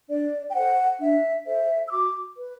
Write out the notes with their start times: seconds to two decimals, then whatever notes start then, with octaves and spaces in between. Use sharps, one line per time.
0.08 D4 D5
0.49 G5
0.55 A4 C5 F#5
1.00 D4 E5
1.45 A4 C5 E5
1.86 E6
1.91 F#4 D6
2.36 B4